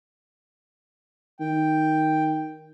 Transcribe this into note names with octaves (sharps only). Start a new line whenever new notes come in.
D#3 G5